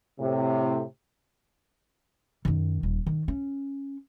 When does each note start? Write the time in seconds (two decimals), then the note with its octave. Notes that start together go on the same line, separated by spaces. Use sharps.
0.20 A2 C3
2.45 F#2 D#3
2.83 D#1
3.06 D#3
3.28 C#4